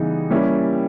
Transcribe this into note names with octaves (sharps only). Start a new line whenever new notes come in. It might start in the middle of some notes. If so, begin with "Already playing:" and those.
Already playing: C#3 E3 G3 B3 D#4
G3 A#3 C#4 E4 G4